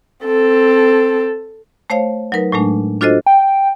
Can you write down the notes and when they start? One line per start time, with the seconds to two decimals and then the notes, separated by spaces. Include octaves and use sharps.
0.25 C4 A4
1.90 A3 C5 C#5 F5
2.32 F#3 D#4 A#4 B4
2.52 A2 F#3 G#3 A3 D4
3.01 D4 F4 F#4 A4 C5 D#5
3.26 G5